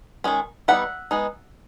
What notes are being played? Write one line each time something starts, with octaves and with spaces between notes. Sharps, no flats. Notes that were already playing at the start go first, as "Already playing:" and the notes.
D#3 G#3 C#4
G3 B3 D#4 E5 F#5
G#3 B3 D#4